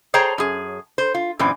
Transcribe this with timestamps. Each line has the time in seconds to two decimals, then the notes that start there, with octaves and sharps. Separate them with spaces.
0.14 G#4 C5 C#5 G5 A5 A#5
0.38 F#2 G#4
0.98 C5
1.14 F4
1.39 F#2 A#2 E3 C4